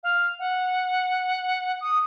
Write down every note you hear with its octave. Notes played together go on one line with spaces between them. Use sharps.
F5
F#5
D#6